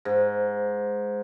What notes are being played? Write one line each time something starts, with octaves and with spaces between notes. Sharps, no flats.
G#2